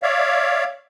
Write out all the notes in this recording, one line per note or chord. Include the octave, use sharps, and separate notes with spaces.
C#5 D5 E5 F5